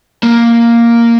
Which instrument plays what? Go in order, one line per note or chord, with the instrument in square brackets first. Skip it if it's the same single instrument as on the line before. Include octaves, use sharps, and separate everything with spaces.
[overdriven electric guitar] A#3